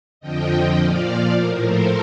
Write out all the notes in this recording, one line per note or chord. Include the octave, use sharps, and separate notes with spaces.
F2 D3 F3 D#5 G5
A#2 F3 D5 F5
A2 F3 A#4
A4 C5